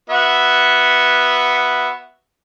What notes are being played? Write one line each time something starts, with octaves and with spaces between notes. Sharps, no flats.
B3 F#4 E5